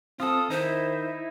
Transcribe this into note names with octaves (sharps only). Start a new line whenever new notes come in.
C4 F4 A4 D#6
D#3 D#4 E4 C5